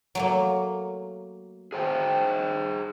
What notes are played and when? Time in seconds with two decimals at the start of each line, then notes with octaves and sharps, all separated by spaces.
0.15 F#3 A3 A#3
1.72 G#4 C5 G5